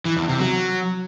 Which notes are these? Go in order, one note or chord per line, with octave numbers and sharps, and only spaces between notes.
E3
E2
C3
F#3